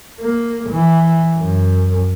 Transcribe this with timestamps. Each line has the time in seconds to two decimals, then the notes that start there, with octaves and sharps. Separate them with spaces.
0.20 A#3
0.70 E3
1.37 F#2